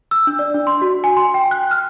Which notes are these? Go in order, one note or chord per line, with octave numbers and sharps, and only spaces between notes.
E6
D4
D5
D4
C6
F#4
G#5
C6
G5
F#6
F6